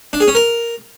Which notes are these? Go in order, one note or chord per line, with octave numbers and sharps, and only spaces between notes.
D4
G#4
C#4
A#4